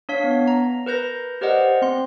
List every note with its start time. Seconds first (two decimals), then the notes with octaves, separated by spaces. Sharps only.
0.09 D4 C#5 F5 B6
0.24 B3
0.48 A#5
0.86 A#4 B4 G6 A#6
1.41 G4 A#4 C5 D5 D#5 F#5
1.82 C4 C6